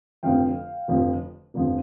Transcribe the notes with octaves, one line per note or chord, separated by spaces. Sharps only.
F1 F2 D3 F3 F5 G5
F1 F2 D3 F3
F1 F2 D3 F3